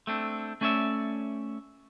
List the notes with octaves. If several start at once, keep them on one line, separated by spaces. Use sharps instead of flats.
A3 C4 D4
A3 C#4 C#5 D5 E5